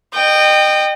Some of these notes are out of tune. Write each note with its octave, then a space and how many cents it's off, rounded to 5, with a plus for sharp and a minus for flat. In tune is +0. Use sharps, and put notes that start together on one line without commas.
D#5 -30 G5 +0